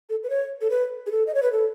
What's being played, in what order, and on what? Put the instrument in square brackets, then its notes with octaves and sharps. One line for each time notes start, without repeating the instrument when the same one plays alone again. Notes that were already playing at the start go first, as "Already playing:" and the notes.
[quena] A4
B4
C#5
A4
B4
G#4
A4
D#5
C#5
B4
A4